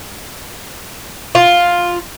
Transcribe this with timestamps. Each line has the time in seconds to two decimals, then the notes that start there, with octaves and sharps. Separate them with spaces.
1.35 F4